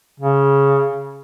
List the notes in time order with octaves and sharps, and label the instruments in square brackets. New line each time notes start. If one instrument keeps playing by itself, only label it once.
[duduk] C#3